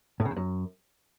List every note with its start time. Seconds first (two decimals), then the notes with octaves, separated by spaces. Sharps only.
0.20 A2
0.25 C#3
0.31 E2
0.36 F#2